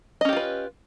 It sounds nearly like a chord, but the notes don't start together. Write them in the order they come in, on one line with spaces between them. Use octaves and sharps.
D#5 C#4 G4 F4 B4